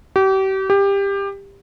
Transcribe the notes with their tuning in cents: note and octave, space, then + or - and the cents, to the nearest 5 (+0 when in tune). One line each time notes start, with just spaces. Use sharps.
G4 -35
G4 +20